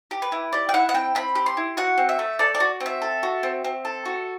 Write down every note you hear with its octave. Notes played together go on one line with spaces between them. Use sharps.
G4
B4
E4
G4 D5
G5
E4 F#5
F#5
C4 G5
C4 B5
G4
C6
E4
F#4 F#5
C4
E5
A3
A4 D5
D5
F#4
C4
E5
A4
F#4
C4
C4
A4
F#4